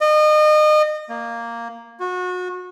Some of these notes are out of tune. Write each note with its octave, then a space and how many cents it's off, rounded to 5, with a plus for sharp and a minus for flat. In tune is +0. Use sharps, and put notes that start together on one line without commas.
D#5 -30
A#3 -5
F#4 -30